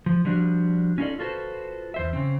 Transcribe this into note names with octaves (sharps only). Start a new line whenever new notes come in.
F3
F3 G3 D4 F#4
C#4 D#4 F4 F#4 A4 D5
F4 F#4 A4 B4 C5
E2 C5 E5
C#3 C4